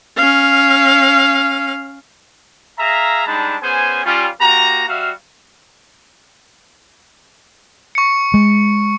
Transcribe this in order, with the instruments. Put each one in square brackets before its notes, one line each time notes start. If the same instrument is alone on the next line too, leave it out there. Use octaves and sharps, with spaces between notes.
[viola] C#4 F5
[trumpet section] G#4 E5 F5 A#5
G3 G#3 D4 D#4 A5 B5
B3 C#4 G#4 C5 G#5
G3 C#4 F4
A#3 F#4 G4 A#5
G3 F#4 E5 F5
[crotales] C#6 C#7
[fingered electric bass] G#3